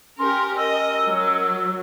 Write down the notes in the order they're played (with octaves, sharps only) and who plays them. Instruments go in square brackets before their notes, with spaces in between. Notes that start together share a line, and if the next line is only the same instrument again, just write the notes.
[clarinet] C#4 [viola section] G4 A#4 [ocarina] C6
[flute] A#4 [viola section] D#5 [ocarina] E6
[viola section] F#3